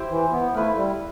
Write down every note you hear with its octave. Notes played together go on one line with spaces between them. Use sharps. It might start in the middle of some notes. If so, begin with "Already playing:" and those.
Already playing: E4 G4 C5
E3
B3
A3 E4 B4 F5
G3